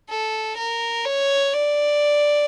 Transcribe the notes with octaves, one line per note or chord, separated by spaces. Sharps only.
A4
A#4
C#5
D5